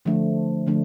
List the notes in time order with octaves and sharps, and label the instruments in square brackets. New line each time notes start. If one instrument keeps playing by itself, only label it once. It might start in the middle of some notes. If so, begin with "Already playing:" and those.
[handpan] D3 F3 A3 D4
D3 F3 A3 D4